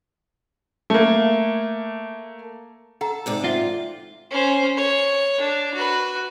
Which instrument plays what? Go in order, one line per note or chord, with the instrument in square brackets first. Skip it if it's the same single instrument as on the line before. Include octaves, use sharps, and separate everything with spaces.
[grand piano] A3 A#3
[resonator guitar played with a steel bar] A4 [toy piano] F#5 A#5
[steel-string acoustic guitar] G#2 C3 D5
[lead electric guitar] F4 [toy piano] E5 F#5
[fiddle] C#4 C5
C#5
D4
F#4 B4